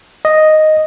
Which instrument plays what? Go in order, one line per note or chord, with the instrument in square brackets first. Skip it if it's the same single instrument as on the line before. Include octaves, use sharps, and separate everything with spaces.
[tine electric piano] D#5